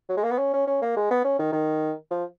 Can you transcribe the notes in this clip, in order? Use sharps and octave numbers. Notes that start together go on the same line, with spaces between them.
F#3
G#3
A#3
B3
C#4
C#4
C#4
A#3
G#3
B3
C#4
D#3
D#3
F3